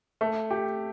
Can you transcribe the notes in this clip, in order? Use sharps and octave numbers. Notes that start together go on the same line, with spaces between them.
A3
G4